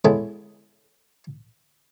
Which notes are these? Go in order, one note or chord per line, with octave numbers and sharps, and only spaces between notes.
G#3 B3 C#4 E4 G#4 A4